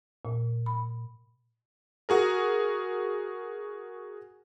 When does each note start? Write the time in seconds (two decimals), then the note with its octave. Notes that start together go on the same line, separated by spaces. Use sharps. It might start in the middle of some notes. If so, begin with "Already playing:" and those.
0.25 A#2
0.66 B5
2.09 F#4 G#4 A#4